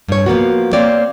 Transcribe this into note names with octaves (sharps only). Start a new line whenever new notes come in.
G2 C#5
F3 A#3 B3 F#4
A#3 C4 C#5 D5